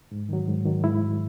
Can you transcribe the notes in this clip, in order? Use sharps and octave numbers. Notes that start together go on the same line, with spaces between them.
G#2
D#3 F#3
G#2
D#3 F#3
G#2 E4
D#3 F#3